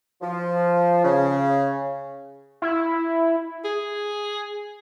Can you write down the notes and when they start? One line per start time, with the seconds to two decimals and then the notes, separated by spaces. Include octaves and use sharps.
0.21 F3
1.04 C#3
2.62 E4
3.65 G#4